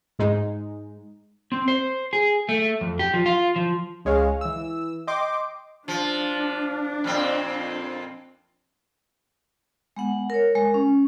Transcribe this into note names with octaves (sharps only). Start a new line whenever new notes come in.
G#2 G#3 D#4
C4
C5
G#4
A3
F2
G4
F3
F4
F3
C#2 G#3 C#5 F5
E3 E6
D#5 G5 C6 D6
F3 D4
F2 A#2 C4
G#3 B3 F#5
A#4 C#5
G#3 A#4
C#4